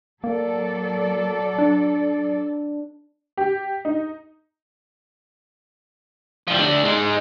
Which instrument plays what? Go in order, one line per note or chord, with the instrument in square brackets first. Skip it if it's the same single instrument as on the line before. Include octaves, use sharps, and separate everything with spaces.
[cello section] F#3 A4 D5 [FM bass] A#3
[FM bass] D4
[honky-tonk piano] G4
D#4
[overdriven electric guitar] F3 G3
A3 D4
G#3 D#4